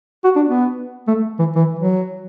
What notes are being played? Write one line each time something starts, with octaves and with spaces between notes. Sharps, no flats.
F#4
D4
B3
A3
E3
E3
F#3